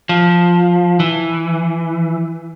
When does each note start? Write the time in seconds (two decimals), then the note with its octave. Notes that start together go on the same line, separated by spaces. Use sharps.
0.09 F3
1.00 E3